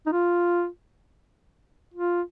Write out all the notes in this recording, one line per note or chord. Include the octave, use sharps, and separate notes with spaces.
D#4
F4
F4